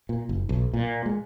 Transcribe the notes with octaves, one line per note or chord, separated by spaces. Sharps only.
A#2
F#1
B1
A#2
G#3